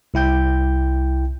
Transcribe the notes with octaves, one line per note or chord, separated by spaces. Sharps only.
C2 E4 G5 G6